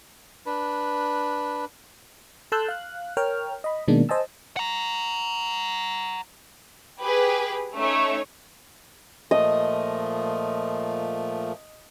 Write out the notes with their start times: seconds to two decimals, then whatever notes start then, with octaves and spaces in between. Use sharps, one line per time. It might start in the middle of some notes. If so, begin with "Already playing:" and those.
0.46 D4 B4
2.52 A4 A5 C6 E6 F#6 G6
2.68 F5 F#6
3.17 A#4 C#5 G5 F6
3.64 D#5 B5
3.88 B2 D#3 G#3 A#3 D4
4.09 C5 D#5 G#5 A5 E6
4.57 F#5 A#5
7.01 G4 G#4 B4
7.74 A3 C#4 D#4 C#5
9.31 A#2 F3 A3 D#5